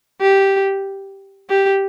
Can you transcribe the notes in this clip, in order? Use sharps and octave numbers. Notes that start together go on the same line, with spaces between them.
G4
G4